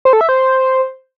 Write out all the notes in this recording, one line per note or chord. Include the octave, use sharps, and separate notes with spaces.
C5
A4
E5
C5